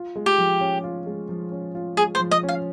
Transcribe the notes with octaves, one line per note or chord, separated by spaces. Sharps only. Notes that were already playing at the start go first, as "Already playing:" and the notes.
Already playing: F4
G#3
G4
F3
C#4
F4
G#3
F3
C#4
F4
G#3 G#4
C5
F3
D#5
C#4
F5